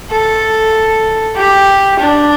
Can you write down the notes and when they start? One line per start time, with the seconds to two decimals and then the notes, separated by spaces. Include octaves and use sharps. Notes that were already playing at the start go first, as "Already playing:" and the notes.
0.11 A4
1.37 G4
2.00 D4